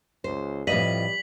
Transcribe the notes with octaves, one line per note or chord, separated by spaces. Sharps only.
C#2 C5
F2 A2 F3 G3 B4 D#5 B6 F#7